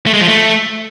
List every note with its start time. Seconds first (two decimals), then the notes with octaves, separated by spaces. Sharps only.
0.07 A3
0.14 G#3
0.21 F3
0.28 A3